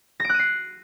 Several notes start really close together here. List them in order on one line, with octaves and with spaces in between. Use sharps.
A#6 D7 F#6 D#7 C7